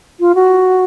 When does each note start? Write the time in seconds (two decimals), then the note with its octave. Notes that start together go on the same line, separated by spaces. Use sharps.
0.20 F4
0.35 F#4